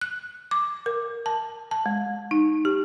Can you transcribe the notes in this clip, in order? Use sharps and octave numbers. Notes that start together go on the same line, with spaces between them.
F#6
D6
A#4
A5
A5
G#3
D#4
G4